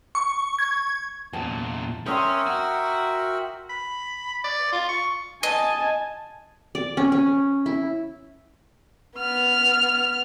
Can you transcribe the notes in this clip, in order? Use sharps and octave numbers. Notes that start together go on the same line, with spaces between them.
C#6
G#6
E2 A#2 A5
C#4 A#4 E5 G5 C6 C#6 D#6
F#4
B5
D5
F4
C#6
D#5 G#5 A5
D5
C#4
C#4
E4
B3 F6